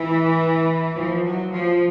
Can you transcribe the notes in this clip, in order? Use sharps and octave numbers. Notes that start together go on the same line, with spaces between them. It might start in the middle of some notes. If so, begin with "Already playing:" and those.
Already playing: E3
F3
F#3
F3